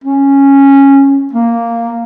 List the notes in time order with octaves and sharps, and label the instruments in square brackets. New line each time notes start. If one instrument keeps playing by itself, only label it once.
[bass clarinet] C#4
A#3